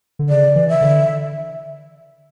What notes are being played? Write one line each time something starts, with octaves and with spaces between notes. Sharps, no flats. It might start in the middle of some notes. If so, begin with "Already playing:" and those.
D3
C#3 D5
E3
E5
D3